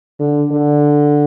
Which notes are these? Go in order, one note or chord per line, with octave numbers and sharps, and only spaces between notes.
D3
D3